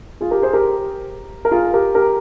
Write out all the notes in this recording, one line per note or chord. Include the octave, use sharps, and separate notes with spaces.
F4 G#4
G4 A#4
G#4 C5
G4 A#4
A#4
F4 G#4
G4 A#4
G4 A#4